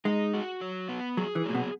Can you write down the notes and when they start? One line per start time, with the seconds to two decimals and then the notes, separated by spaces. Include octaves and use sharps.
0.05 G#3 D#4
0.34 F#4
0.61 F#3
0.89 B3
1.17 F#3 G#4
1.35 E3
1.45 A#2 F#3
1.55 B2